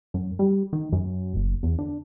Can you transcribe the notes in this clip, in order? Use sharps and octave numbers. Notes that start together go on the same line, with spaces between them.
F#2
G3
D#3
F#2
F#1
E2
D3